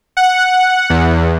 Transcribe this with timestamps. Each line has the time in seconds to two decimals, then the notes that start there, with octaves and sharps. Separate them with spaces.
0.17 F#5
0.90 E2